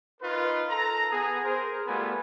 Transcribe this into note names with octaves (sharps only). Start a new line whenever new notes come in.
D#4 F4 A#4 B4
A4 A#5
B3 G#4
G#4 A#4 C5
G3 A3 B3 F4 G#5 B5